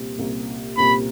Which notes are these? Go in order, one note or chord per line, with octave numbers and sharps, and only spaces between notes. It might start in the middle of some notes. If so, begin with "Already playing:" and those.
Already playing: C2 A#2 G3 C4
C2 A#2 G3 C4
C2 A#2 G3 C4 B5